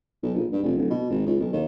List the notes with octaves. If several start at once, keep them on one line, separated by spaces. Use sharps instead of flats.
B1
A#1
G2
F1
D1
B2
G#1
C#2
B1
D#2